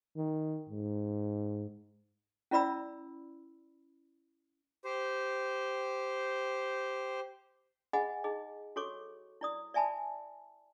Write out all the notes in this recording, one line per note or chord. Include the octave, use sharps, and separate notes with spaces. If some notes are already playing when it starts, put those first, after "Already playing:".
D#3
G#2
C#4 E4 D5 B5 E6
G4 C5
G#4 D#5 F#5 G#5 B5
D#4 G#4 D#5
F#4 A4 C#5 C#6 D6
E4 D5 D#6
D5 E5 G#5 A5 B5